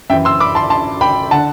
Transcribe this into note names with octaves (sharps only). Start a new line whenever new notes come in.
F#2 E3 E5 G5
C6 E6
B5 D6
A5 C6
A5 C6
G5 B5
D3 F#5 A5